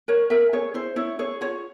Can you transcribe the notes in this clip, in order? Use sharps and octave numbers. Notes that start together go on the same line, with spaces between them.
A#4 C#5
A#4 E5
G#4 C#5
E4 C5
E4 C#5
G#4 C#5
F4 C#5